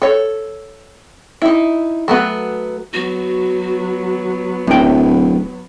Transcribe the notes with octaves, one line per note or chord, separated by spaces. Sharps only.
A4 C#5
D#4 E4
F#3 A3 B3 F#4
F#3 B3 F#4
D1 F#2 G5